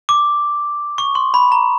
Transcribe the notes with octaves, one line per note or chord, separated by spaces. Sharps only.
D6
C#6
C6
B5
A#5